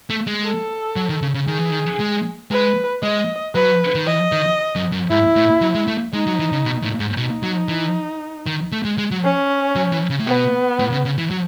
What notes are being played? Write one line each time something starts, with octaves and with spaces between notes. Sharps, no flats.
A3
G#3
A4
F#3
D#3
C#3
C#3
D#3 G#4
E3
D#3
G#3
G#3 B4
G#3 D#5
F#3 B4
D#3
E3 D#5
D#3
F#2
F#2
G#2 E4
A2
F#3
G#3
A3
G#3 D#4
F#3
E3
C#3
B2
A2
G#2
B2 D#4
F#3
E3
D#3
A3
G#3
G#3
F#3
C#4
F#3
E3
C#3
A2
B2 B3
A2
C#3
C#3
E3
F#3